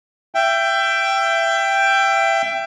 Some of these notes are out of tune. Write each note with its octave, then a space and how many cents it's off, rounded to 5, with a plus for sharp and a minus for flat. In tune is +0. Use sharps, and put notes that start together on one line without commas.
E5 +25 G5 +0